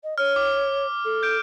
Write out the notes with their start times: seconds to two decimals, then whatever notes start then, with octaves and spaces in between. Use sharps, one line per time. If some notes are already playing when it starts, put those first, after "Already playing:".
0.03 D#5
0.18 C#5 F6
0.36 D6
1.04 A4
1.23 G6 D7